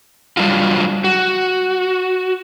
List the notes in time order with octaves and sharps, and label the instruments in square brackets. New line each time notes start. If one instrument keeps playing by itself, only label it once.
[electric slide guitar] F#3 G3 D4 D#4 F4
F#4